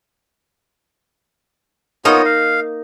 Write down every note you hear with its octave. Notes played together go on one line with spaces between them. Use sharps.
A#3 B3 D#4 F4 C#5 D#5
F5